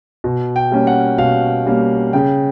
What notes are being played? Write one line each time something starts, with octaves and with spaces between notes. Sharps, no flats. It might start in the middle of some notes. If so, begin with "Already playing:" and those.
B2
G5
G3 A#3 C#4
F#5
B2 F5
G3 A#3 C#4
C#3 G5